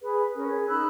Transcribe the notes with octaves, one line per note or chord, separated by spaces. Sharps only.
G#4 B4
C#4 A#4
G#4
D#4 B5 E6 F#6